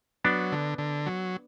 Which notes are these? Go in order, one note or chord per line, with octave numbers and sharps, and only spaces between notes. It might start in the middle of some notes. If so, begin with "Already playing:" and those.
F#3 B3 D4
D3
D3
F#3